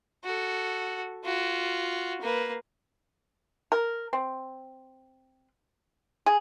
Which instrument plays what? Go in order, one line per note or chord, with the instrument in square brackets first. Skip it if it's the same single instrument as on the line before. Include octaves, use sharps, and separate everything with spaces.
[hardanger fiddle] F#4 A4
F4 F#4
A#3 B4
[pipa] A#4
C4
G#4